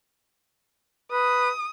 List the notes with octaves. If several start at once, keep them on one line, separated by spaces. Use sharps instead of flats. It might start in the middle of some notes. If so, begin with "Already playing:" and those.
B4 D#6